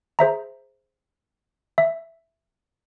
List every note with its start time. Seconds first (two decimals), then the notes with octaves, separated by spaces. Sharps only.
0.19 G#4 C5 E5 A#5
1.78 E5